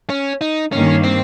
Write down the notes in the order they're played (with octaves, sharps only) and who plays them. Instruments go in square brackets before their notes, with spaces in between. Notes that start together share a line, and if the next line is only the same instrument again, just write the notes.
[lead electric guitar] C#4
D#4
[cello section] G2 D#3 A#3 [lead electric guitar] C#4
[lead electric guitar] C4